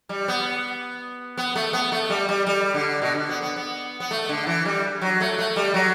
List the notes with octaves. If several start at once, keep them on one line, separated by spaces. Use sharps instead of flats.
G3
B3
B3
A3
B3
A3
G3
G3
G3
D3
B2
D3
B3
B3
B3
B3
A3
D3
E3
G3
F#3
A3
A3
G3
F#3